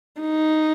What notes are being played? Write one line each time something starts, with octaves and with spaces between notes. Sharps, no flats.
D#4